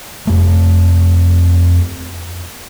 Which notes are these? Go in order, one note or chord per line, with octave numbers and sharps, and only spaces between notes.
F2 A3